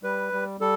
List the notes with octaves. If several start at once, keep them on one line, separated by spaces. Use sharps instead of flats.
G3 B4
G3
G3 A4